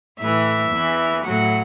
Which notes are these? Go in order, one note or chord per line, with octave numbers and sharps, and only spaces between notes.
A2 E3 E5
E2 E3
A2 F#3 F#5